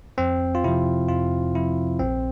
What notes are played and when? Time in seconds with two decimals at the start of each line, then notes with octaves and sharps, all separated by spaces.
0.18 F2 C4
0.55 F4
0.64 C3 F3 E4
1.09 F2 F4
1.55 C3 F3 E4
1.99 A#1 C4